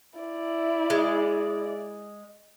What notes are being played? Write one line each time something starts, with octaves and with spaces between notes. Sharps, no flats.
E4 D5
G#3